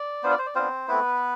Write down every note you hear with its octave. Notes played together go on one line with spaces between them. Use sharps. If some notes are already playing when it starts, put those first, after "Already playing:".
Already playing: D5
B3 D4 F4 C5
D5
C5
D5
B3 C4 D4 F4 C5
A3 B3 C4 E4 B4